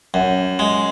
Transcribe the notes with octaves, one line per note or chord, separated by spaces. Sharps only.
F#2
G#3